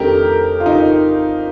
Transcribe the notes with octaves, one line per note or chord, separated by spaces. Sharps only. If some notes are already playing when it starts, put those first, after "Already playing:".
Already playing: F2 D#3 A3 D4 G4 A#4
F4
D#4